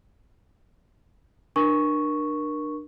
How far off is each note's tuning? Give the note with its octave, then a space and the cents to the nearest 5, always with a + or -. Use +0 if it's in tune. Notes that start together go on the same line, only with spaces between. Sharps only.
D4 +30 A#4 +25 C#6 +0